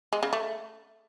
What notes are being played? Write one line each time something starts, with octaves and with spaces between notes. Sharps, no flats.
G#3
C#3
A3